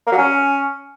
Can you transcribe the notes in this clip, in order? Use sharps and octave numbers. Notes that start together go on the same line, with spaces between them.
A#3
F#3
C#4